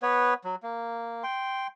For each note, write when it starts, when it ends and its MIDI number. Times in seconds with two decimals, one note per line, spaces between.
0.02 0.34 59
0.02 0.34 71
0.02 0.34 73
0.44 0.55 54
0.63 1.23 58
1.23 1.67 79
1.23 1.67 84